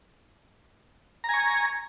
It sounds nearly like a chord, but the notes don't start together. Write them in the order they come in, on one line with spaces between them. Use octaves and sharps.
A#5 G#5 C#6